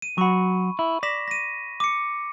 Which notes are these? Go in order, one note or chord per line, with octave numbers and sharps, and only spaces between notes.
D#7
F#3 F#4 B5 C#6
E4
D5 A#6 B6 E7
A#6 D#7
D6 C#7